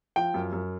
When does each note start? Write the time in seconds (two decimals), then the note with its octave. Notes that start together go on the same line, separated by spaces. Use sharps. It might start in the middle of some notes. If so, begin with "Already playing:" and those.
0.16 F3 G5
0.34 F#2
0.53 F#2